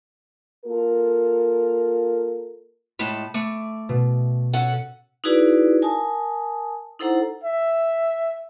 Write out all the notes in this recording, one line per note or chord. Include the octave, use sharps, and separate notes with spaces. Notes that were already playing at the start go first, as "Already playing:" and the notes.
A#3 F4 A4 A#4
A2 G#3 A5 B5
A3 D6
B2
C#4 A4 F#5
D#4 E4 F#4 G#4 B4 D5
A#4 G#5 A5 D#6
D#4 E4 A4 C5 F#5 A#5
E5